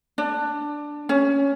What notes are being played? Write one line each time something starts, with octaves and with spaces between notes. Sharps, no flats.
D4
C#4